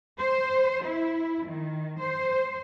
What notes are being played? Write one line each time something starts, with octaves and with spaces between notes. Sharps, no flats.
C5
E4
D#3
C5